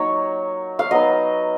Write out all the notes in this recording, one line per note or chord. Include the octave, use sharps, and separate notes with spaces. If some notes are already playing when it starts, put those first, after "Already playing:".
Already playing: F#3 A#3 D#4 C#5
F5
F#3 B3 D#4 D#5